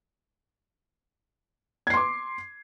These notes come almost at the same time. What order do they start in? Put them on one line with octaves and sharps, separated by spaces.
G#6 C7 C6 D6